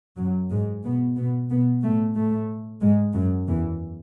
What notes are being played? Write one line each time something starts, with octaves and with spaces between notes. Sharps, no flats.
F#2 F#3
G#2 G#3
B2 B3
B2 B3
B2 B3
A2 A3
A2 A3
G#2 G#3
F#2 F#3
E2 E3